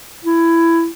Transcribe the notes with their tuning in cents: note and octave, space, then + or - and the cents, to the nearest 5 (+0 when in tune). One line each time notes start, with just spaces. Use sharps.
E4 +15